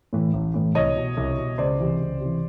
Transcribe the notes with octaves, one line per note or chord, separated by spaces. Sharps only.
A2 E3
A1
A2 E3
C2 C#5 D#5
B2
C2
B2
C#2 C5 D5
C3 E3
C#2
C3 E3